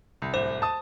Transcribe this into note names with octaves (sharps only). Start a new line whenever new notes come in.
C2
D1 C2 C5
A5 D#6